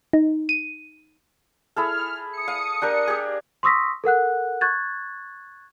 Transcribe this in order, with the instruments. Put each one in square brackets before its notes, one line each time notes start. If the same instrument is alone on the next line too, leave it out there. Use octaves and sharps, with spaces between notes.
[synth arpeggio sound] D#4
D#7
[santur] E4 G#4 A4 [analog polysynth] F6
[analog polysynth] D#6 C#7
[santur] F5
D4 G4 A#4
G4 G#4
[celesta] C6 C#6 D#6 E6 A#6 B6
A4 A#4 F#5 F#6
C#6 F#6 G#6 A6